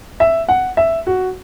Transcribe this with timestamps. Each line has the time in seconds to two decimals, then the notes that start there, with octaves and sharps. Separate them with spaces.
0.20 E5
0.49 F#5
0.77 E5
1.07 F#4